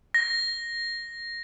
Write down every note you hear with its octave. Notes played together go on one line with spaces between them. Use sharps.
A#6